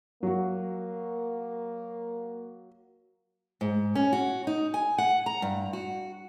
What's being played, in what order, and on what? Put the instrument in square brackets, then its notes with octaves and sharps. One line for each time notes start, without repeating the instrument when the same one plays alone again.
[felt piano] F#3 F#4 [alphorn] A#3
[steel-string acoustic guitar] G#2
C#4
F#4
D#4
G#5
F#5
A#5
G2
F#4